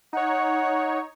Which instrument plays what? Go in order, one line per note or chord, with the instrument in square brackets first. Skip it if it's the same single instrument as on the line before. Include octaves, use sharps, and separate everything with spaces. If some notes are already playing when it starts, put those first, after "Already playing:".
[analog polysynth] D#4 C#5 [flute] F#5